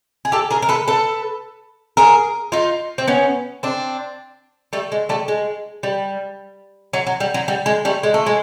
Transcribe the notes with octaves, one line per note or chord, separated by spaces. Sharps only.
G#4
G4 A4
G#4 A#4
A#4
A4 B4
A4 B4
G#4 A#4
D#4 F4
C4
B3 C#4
C4 D4
G3 A3
G#3
G3 A3
G#3
G3
F#3
F#3
G3
F#3
G3
G#3
G3 A3
G#3
A3
G#3